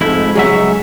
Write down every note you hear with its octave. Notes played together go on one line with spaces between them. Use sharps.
F2 G#2 A3 E4
C#2 F#3 G#4 D#5 E5 F#5